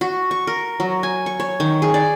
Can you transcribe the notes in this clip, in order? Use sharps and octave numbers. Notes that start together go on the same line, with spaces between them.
F#4
C#6
A#4
F#3
G#5
C#6
C#5
D#3
G#4
D5